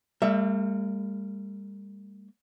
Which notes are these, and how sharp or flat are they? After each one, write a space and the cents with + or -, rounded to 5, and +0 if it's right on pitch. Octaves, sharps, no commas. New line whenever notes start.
G3 +35 A#3 -40 E5 +0